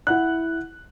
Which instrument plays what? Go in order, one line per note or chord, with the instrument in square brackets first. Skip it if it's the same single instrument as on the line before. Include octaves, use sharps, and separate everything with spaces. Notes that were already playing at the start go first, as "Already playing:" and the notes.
[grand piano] E4 F#5 F#6